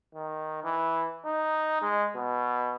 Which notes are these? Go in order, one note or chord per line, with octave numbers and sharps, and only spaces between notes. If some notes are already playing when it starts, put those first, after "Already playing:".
D#3
E3
D#4
G#3
B2